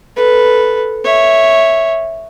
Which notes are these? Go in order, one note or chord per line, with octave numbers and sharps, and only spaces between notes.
A4 B4
C#5 E5